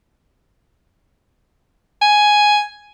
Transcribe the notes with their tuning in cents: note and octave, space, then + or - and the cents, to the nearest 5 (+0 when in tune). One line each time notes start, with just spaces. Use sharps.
G#5 +5